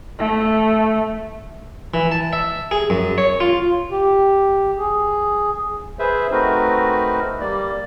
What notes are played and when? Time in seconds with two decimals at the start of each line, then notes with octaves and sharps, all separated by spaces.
0.18 A3
1.94 E3
2.12 A5
2.33 E5
2.71 G#4
2.90 F#2
3.18 C#5
3.40 F4
3.91 G4
4.78 G#4
5.99 G#4 B4 C5 E5
6.32 A3 C4 D#4 F#4 A#4 B4
7.40 G3 A#3 D5